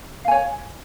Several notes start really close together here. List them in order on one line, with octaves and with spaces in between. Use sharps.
F5 G#5 C#5